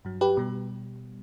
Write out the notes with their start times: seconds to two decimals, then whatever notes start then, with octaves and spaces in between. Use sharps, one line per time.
0.05 G2 F#3
0.21 G4 B4
0.37 B2 G3